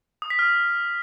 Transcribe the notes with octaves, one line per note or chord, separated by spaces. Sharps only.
D#6
B6
F6